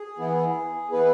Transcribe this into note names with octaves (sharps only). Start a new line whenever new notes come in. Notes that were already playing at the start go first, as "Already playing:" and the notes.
Already playing: G#4
E3 B3 E4
E3 B3 E4 G#4 B4